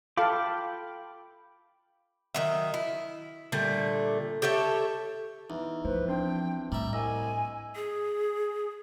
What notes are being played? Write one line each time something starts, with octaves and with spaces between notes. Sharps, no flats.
F4 A4 F5 G5 B5 D6
D#3 F#3 E5
E4
A#2 D3 G3 A3
G4 A4 C#5 E5
E2 D#4
F3 B4 C5
C4 D4 G5 C6
A2 G3 E5 A#5
C2 D#5 G#5 E6
G#4